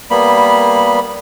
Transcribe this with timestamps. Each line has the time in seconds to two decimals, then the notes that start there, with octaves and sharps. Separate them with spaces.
0.11 G3 A#3 B3 B5